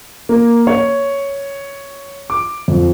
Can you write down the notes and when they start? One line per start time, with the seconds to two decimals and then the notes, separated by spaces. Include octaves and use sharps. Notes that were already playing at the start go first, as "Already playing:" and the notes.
0.29 A#3
0.67 C#5
2.30 D6
2.68 F2